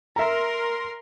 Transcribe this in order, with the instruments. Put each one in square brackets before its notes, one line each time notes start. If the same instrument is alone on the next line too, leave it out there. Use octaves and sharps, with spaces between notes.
[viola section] A#4 C6 [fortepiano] E5 A#5